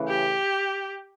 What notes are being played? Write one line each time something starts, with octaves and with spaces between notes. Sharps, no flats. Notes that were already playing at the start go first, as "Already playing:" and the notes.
Already playing: C#3 E3 A3 C#4
G4